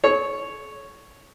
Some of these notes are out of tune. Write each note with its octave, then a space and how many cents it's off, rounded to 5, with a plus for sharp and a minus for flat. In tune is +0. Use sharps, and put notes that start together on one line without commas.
A4 -45 C#5 +0